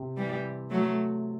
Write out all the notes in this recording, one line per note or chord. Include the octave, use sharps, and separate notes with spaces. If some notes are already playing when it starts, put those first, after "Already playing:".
Already playing: C3
E3 G3
F#3 A3